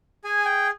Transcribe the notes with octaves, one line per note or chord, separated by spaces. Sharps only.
G#4 G#5
G5